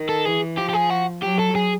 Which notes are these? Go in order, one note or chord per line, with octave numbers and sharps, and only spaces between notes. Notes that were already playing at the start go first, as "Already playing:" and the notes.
Already playing: D#3
A4
E3 G#4
F3 G4
G4
G#4
F#4
F#3 G4
A4
G#4